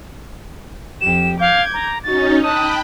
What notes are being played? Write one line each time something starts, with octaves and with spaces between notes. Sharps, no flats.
F2 G4 E7
F5 D6 G6 G#6
A#5
C#4 D#4 F#4 A6
D#4 G5 A5 B5 D#6 F#6